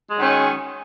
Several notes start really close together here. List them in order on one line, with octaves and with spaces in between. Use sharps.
G#3 F#3 D#3 C#4